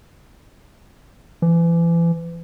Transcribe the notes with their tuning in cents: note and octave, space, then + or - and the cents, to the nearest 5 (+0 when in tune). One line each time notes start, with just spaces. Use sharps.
E3 +35